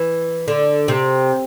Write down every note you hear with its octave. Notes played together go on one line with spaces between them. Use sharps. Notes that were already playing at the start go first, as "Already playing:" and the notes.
Already playing: E3
D3
C3